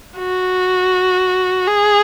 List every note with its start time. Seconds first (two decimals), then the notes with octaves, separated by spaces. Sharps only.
0.18 F#4
1.67 G#4